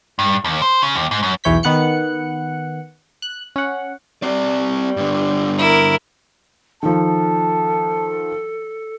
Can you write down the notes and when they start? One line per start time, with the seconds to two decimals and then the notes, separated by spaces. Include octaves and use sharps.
0.19 G2
0.45 D#2
0.62 C5
0.82 C#3
0.95 D#2
1.11 G#2
1.23 F#2
1.44 B1 E2 E3 C#5 G6 B6
1.63 D#3 B3 F#5 F#6 C#7
3.22 F#6
3.56 C#4 F#5
4.22 G3 C4 D5
4.97 G2 D3
5.58 E4 A#4
6.83 D#3 F3 A4 A5